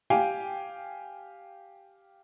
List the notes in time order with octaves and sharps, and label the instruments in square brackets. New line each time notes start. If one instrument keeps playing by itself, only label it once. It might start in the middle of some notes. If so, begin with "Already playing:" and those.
[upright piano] G4 F5 G5 G#5